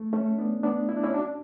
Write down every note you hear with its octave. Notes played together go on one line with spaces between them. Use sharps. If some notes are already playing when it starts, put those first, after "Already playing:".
Already playing: A3
A3 C#4
B3 D4
B3 D4
E4
D4
C#4 E4
D4 F#4